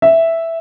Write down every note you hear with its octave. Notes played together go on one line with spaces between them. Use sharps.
E5